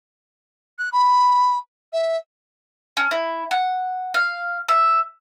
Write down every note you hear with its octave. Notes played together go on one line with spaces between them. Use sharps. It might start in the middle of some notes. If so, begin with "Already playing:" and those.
F#6
B5
E5
C#4
E4
F#5
F5
E5